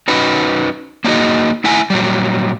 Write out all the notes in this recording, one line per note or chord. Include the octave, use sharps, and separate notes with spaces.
C#4 D#4 F#4 B4
A#3 D4 D#4 F#4 G#4 D#5
A3 E4 E5 F#5 G#5
A#2 F#3 G3